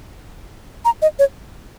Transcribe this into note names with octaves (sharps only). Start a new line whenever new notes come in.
A#5
D#5
C#5